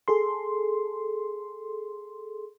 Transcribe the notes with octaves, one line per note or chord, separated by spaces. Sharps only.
G#4 A4 C6